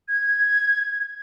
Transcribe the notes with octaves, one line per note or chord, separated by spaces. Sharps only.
G#6